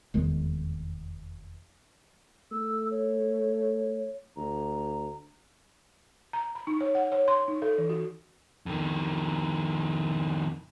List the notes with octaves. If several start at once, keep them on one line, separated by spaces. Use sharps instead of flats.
F1 E2 D#3 G#3
A3 E6
C#5
D2 A#5
A#5
B5
D#4
C#5
F#5
C#5
C6
D#4
A4
E3
F#4
F2 D#3